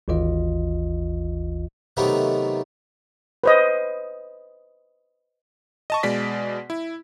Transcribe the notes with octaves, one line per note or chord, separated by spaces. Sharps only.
G#1 D#2 E3 F4 D#5
C3 D#3 F#3 A3 B3 D#4
B4 C5 D#5
D#5 A5 C#6
B2 G#3 D5 B6
E4